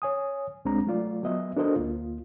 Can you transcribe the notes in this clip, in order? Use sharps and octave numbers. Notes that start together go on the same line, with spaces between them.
C#5 G#5 D#6
C2 G#3 C4 D4 A#5
F#3 A3 F4 D5
F#3 B3 D#5 E5
D4 F#4 A4 A#4 C5 D#5
D2 A#3 F4